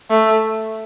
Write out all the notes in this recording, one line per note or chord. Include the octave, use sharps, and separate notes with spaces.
A3